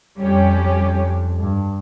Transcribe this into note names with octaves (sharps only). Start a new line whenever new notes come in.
F2 G3 C#4 G4
G2